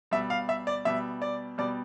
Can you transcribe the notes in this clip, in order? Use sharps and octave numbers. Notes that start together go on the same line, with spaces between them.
B2 G3 E5
F5
E5
D5
B2 G3 E5
D5
B2 G3 D5